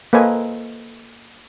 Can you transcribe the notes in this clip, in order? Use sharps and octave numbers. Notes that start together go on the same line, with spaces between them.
A#3 A4 B4 C5 D#5 G#5